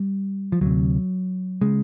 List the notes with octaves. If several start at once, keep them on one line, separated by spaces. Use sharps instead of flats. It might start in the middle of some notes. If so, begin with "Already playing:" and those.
Already playing: G3
F3
D2 C3 F#3
C#3 G#3